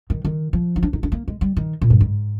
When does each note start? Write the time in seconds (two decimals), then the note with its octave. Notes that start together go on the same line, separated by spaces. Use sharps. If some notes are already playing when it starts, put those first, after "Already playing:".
0.10 D#3
0.25 D#3
0.53 F3
0.76 D#4
0.83 D4
0.93 D#4
1.03 D4
1.12 A#3
1.28 G#3
1.41 G3
1.57 D#3
1.82 A#2
1.90 G2
2.01 G#2